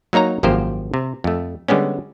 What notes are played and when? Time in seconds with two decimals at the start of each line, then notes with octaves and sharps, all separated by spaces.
0.13 F#3 A#3 D#4 C#5 A#5
0.43 G#1 F#2 F3 A#3 G4 C5
0.94 C3
1.24 F2 A3
1.68 D3 G3 G#3 B3 C#4